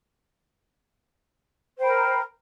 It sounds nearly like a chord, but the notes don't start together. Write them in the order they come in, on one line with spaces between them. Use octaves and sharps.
C5 G5 B5 A#4